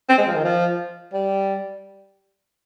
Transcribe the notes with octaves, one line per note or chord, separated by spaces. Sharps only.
C4
G#3
F3
D#3
F3
G3